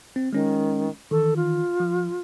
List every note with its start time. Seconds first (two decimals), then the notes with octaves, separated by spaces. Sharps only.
0.16 C4
0.33 D#3 G#3 C#4
1.11 D#3 E3 A4
1.36 F4
1.80 F3